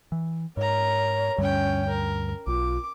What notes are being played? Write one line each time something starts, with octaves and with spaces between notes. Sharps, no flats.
E3
G#2 A#4 C#5 A#5
D2 G2 G3 C#4 G5
A#4
B1 F4 D6